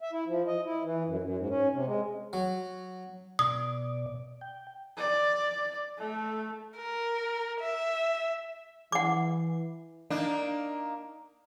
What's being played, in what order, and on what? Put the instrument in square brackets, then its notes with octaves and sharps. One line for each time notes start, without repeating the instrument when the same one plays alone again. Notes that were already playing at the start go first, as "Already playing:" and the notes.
[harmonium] E5
E4
F3
D#5
E4
E3
F#2
F#2
G#2
C#4
C3
G#3
[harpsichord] F#3
[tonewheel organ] B2 D5 [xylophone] D#6
[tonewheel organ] G5
[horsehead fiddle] D5
A3
[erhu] A#4
E5
[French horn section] E3 [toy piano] F#5 D6
[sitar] A#3 D4 D#4